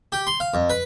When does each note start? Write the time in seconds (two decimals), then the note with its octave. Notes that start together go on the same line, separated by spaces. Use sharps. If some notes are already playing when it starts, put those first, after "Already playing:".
0.12 G4
0.27 C6
0.40 F5
0.54 F2
0.70 B4